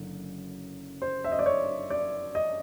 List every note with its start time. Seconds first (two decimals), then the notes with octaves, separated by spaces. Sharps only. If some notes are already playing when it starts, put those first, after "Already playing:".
Already playing: F#1 F#2 D3
1.02 C5
1.24 E5
1.32 D#5
1.39 D5
1.46 C#5
1.91 D5
2.35 D#5